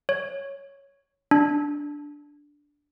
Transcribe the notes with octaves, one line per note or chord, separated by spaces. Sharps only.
C#5
D4